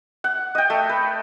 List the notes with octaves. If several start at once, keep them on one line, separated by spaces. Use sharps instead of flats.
F#5
D#5 G5
A3
B4